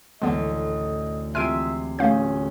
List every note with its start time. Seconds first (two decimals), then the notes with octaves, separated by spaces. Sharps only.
0.22 A1 D2 G#3 B3 D#5
1.35 C3 G#3 F4 E5 G#5 C6 F6 D7
1.99 D1 A3 C#4 G#4 F5 G6